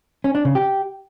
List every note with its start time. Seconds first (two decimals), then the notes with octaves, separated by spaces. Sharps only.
0.24 C#4
0.35 D4
0.45 C#3
0.55 G4